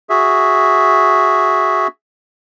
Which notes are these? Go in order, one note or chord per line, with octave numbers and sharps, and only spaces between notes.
F#4 G#4 E5